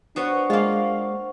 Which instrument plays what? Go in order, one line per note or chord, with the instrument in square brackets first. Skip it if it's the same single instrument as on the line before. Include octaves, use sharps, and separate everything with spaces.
[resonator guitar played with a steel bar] B3 F#4 C#5 [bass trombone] D4 [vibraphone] C5 F#5 C#6
[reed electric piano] G#3 [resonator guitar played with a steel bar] A#3 F4